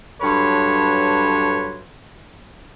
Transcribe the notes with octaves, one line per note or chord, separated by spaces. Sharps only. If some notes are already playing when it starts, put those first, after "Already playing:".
G2 F#3 A4 B4 C#5 C6